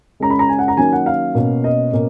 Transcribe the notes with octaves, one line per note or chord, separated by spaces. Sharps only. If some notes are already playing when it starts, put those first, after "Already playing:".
C#3 G#3 C#4 A#5
B5
A#5
G#5
F#5
A#5
D#3 F#3 A#3 C#4 G#5
F#5
F5
B2 A#3 C#4
D#5
B2 A#3 C#4